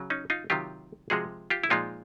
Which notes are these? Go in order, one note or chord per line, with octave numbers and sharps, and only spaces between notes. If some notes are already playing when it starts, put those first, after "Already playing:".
Already playing: C#3 F#3
C#4 D#4
D#4 F4
C3 D#3 F#3 F4 G4
C3 F3 G#3 F#4 G#4
F4 G4
E4
A#2 F3 G#3 D#4 F4